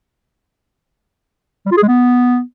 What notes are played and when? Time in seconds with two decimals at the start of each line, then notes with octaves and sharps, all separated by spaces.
1.66 G3
1.72 F4
1.77 G#4
1.83 G#3
1.88 B3